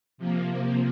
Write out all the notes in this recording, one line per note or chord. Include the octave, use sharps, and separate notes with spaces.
C3 F3 A#3